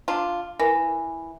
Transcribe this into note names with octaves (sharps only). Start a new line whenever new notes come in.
D4 F4
E3 A#4